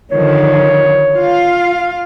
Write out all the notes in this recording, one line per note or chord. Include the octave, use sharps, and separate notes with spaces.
D3 D#3 F3 C#5
F4 F5